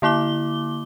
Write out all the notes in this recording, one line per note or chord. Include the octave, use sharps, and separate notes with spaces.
D3 A#3 E4 D6 G7